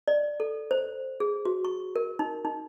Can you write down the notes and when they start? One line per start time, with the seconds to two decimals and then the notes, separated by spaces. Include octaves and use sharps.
0.08 D5
0.40 A4
0.71 C5
1.20 G#4
1.45 F#4
1.65 C#6
1.96 A#4
2.19 D#4
2.45 D#4